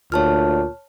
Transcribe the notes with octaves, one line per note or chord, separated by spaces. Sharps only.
D2 A#2 C#5 A5 F6